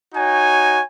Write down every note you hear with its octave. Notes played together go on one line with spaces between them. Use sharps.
D#4 F#4 C#5 G#5